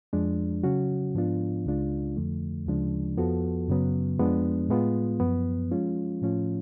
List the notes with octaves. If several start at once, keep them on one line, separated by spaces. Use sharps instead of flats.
F2 F3 G#3 D4
C#3 F#3 C#4 F#4
G#2 F3 B3 D4 F4
C#2 C#3 G#3 D4 F4
F2 D3 F3 A3
D2 C#3 F3 G#3 D4
F2 F3 B3 F#4 A4
F#2 C#3 F#3 B3
F2 F3 G#3 B3 D4
A2 G#3 B3 F4
F#2 F3 B3
F3 G#3 C#4 F4
A2 F3 A3 C#4 F4